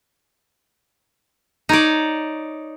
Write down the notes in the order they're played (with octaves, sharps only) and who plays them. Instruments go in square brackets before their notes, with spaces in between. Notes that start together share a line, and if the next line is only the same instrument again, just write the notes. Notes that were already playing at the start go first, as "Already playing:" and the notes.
[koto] D#4 C#5 D5